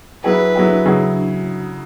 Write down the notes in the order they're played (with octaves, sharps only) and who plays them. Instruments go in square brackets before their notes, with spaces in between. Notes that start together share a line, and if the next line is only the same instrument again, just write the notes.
[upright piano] F#3 E4 G#4 [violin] B4
[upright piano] F#3 E4 G#4
C#3 F#3 E4 G#4